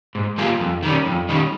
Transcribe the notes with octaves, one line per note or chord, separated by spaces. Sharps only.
G#2
G3 A#3 F4 G#4
F2
D#3 G3 C#4
F2
D#3 G3 C#4